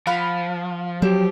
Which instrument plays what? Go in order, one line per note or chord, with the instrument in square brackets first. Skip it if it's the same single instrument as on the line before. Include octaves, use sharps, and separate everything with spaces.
[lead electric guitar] F3 [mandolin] F5 F#5 B5
[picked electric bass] F#3 [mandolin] C4 [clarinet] G4